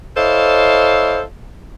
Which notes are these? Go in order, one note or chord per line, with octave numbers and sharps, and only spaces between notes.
E4 A4 C5 C#5 D#5 F5